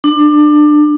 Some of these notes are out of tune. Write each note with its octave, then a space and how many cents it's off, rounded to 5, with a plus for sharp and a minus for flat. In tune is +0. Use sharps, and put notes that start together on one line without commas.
D4 +25